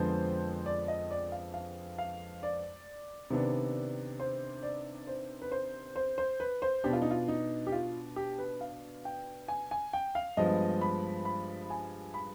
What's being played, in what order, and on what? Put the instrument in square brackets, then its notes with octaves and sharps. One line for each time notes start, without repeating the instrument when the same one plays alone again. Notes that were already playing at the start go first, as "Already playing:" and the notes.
Already playing: [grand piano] F2 D3 F3 G#3 B3 C5
D5
D#5
D5
F5
F5
F5
D5
C3 D#3 B3 D4
C5
D5
C5
B4
C5
C5
C5
B4
C5
B2 B3 D4 G4
F4
D#4
F4
D#4
G4
F4
G4
B4
F5
G5
G#5
G#5
G5
F5
G2 F3 G#3 B3 D#5
B5
B5
G#5
B5